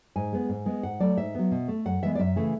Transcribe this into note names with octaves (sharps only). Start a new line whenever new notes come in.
G#2 G#5
G#3 B3
G#2
G#3 B3
G#2 F#5
F#3 A3 D5
G#2 E5
F#3 B3
B2
A3
F#2 F#5
E3 G#3 B3 E5
D5
F#2 E5
C#3 E3 A3